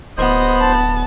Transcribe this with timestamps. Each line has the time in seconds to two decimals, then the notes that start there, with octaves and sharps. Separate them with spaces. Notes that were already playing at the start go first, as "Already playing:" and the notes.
0.18 D1 B3 C5 D#5
0.61 A5